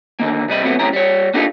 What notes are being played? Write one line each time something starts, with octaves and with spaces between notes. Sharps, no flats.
D3 D#3 A#3
C3 G3 D#5 B5
C3 F#3 A3 B3
B1 F2 A2 C#4 G4 A#5
G3 C#5
A#3 D4 D#4 F4 G4 A4